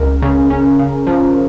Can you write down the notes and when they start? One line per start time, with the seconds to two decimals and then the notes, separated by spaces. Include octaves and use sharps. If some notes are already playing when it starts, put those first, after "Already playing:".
Already playing: C#2 A#4
0.22 C#3
0.50 C#4
0.79 C#3
1.07 F3